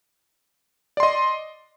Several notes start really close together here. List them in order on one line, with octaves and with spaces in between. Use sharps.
D5 C6 D#5